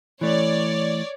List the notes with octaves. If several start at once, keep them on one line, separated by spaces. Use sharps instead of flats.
E3 A3 C#5 D5